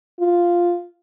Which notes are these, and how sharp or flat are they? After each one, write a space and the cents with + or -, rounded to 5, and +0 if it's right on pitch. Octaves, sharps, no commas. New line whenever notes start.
F4 +0